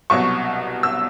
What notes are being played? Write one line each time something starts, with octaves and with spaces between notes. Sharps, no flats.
C2 B2 F#3 C#6
E6